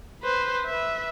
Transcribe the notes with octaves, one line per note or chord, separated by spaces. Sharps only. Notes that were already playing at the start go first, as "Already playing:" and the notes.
B4 C5
B4 E5